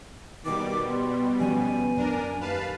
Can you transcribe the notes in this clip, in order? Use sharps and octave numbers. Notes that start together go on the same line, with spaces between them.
B2 D#3 G3 D6
B3 C6
D2 F3 C#4 G#5
F#2 D4 A#4
D#2 B4 F5 A5